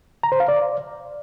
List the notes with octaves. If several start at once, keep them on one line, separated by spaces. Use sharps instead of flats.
A#5
C5
F5
D5